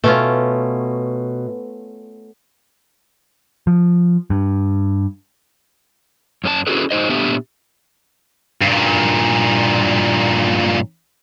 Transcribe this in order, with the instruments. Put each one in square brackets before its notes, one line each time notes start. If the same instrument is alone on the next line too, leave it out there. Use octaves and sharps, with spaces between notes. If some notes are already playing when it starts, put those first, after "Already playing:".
[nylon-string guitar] B2 [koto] A3 C#4 F4
[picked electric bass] F3
G2
[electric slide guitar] F#2 C#4 G4 A5
C#4 E4 F#4 G#4 A4 B4
F#3 D#4 C5 D#5
A#2 A3 B3 D4 G4 E5
[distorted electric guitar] G2 A#2